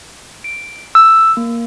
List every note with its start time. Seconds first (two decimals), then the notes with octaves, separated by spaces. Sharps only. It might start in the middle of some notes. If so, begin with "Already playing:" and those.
0.44 D7
0.95 E6
1.37 A#3